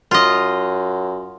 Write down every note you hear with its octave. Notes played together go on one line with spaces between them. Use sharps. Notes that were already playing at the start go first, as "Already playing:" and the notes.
F#2 F4 D#5